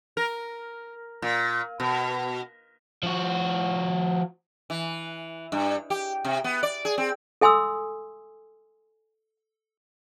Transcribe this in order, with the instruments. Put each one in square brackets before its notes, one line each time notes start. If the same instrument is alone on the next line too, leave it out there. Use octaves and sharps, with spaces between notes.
[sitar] A#4
A#2
B2
[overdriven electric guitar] F3 F#4
[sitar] E3
G2
G4
C3
B3
D5
G#4
C4
[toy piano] A4 E5 G#5 C6 D#6 E6